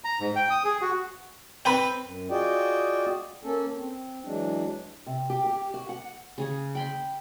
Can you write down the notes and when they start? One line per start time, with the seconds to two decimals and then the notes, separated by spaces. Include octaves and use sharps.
0.04 A#5
0.20 G#2
0.36 G5
0.50 D#6
0.65 G#4
0.81 F#4
1.65 C4 B4 G5 B5
2.00 F#2
2.30 F4 F#4 G#4 D5 D#5 G5
3.44 A#3 C#4 A4
3.77 C4
4.25 E3 F#3 G#3 D4
5.06 C3
5.30 G4
5.46 G4
5.74 F#4
5.89 F#5
6.38 C#3 G#4 C#5
6.75 G5 B5 C6